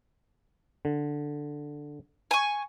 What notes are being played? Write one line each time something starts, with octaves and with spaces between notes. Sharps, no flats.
D3
G#5 C#6